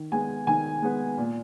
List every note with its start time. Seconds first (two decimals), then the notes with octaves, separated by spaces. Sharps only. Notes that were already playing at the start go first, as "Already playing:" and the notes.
Already playing: D#3
0.12 G#3 B3 G#5
0.47 D#3 G#5
0.82 G#3 B3
1.18 A#2